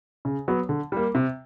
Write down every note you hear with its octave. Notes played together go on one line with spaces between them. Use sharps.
C#3
F#3 B3
D3
G3 A#3
C3